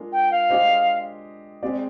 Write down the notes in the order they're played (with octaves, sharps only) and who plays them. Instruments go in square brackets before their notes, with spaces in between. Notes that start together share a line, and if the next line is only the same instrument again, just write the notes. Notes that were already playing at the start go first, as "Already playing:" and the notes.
Already playing: [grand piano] G#3 D4 F4 A#4
[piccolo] G5
F5
[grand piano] G#3 D4 G4 C5 D#5
G#3 C4 G4 D5